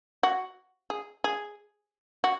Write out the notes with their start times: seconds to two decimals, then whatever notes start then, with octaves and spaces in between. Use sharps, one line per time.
0.23 F#4
0.90 G#4
1.24 G#4
2.24 F#4